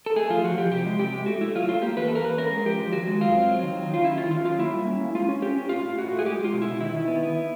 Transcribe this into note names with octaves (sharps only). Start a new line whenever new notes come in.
A4
A3 G#4
F3 F4
F3 F#4
F3 G4
C3 G4
G#3
C3 G4
G#3
A3 F#4
A3 E4
F#3 F4
A3 F4
A#3 G4
E2 B4
A#3 A4
A#4
E2 B4
C#4 A#4
G#3
F3 G4
F3
D#3 F#4
G#3
F#2 F4
C4
F#3
D#3
F#3
D#3 F4
C#4 E4
D#3 F4
D#3 F4
F#3 F4
A#3 E4
G3
C#4
A#3
G#3 F4
C#4
C#4 G4
C#4
A2 F4
A2
A2 F#4
A3
G#4
G#3 G4
G#3 F4
B2
E4
B2
D#3 E4
D#3
B3
E4